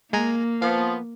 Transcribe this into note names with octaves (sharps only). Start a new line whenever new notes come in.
G#3 A#3 G#5 A#5
F3 B3 F5